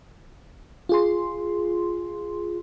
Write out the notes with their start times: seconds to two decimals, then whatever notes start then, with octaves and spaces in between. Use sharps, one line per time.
0.89 F4 G#4 C6